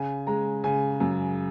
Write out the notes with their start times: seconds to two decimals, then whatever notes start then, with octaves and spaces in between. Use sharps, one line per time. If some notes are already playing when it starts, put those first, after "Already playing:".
Already playing: C#3 G#5
0.27 G#3 A#5
0.64 C#3 G#5
1.00 F#2